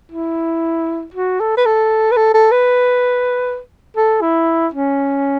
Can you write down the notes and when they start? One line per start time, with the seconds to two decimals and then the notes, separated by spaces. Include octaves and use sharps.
0.12 E4
1.14 F#4
1.40 A4
1.57 B4
1.66 A4
2.12 B4
2.17 A4
2.34 A4
2.51 B4
3.97 A4
4.21 E4
4.74 C#4